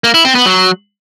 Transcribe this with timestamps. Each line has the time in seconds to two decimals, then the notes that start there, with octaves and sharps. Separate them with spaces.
0.04 A#3
0.14 E4
0.25 C4
0.35 B3
0.46 F#3